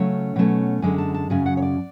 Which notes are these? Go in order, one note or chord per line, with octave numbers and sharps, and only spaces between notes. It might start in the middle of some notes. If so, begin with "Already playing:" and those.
Already playing: C#3 F#3 A3 C#4 C#5
B2 F#3 A3 C#4
F#2 D3 G#3 G#5
A5
A5
F#2 C#3 F#3 G#5
F#5
C#5
D5